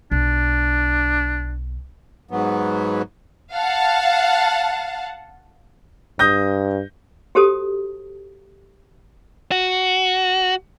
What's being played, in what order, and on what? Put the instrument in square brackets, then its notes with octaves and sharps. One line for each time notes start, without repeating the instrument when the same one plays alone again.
[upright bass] B1 [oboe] D4
[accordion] G#2 F#3 B3
[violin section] F5 F#5 A5
[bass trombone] G2 [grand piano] D#6 G6 A#6
[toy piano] F#4 G4 A4 C5 A5 D#6
[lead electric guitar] F#4